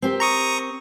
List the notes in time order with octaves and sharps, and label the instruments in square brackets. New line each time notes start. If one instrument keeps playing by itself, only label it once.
[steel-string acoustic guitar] C4 G4 A#4
[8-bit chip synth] A#5 C#6 D#6